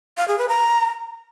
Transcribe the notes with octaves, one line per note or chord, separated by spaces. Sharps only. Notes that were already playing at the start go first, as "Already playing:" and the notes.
F5
G#4
B4
A#5